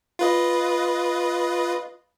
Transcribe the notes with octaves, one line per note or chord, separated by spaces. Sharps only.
F4 B4 D#5